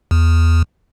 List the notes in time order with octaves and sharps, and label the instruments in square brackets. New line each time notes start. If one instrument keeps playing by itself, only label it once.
[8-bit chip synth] E2